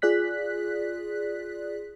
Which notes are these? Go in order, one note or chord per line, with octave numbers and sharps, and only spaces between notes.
F4 G#4 D5 F#6 B6